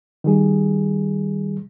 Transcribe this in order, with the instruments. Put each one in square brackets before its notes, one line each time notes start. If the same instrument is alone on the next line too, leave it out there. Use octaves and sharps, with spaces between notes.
[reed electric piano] D#3 G3 G#4